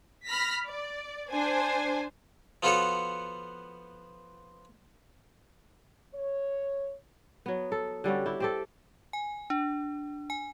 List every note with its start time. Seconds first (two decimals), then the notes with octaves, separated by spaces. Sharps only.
0.26 B5 F6 A#6 B6
0.66 D5
1.31 D4 C5 G#5
2.63 F3 B3 F4 F#4 A4 C#5
6.14 C#5
7.46 F#3 B3
7.72 A4
8.04 D3 G3 C#4 F#4
8.26 E4 G4
8.40 C4 G4 A4
9.13 G#5
9.50 D4
10.30 G#5